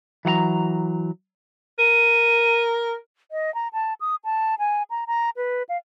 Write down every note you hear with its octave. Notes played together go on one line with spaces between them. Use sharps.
E3 F#3 F#5 A#5
A#4 D#7
D#5
A#5
A5
D#6
A5
G#5
A#5
A#5
B4
F5